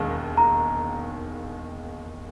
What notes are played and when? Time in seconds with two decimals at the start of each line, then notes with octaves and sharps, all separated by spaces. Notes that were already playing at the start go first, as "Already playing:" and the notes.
Already playing: E1 D#2 D#3 G#3
0.37 A#5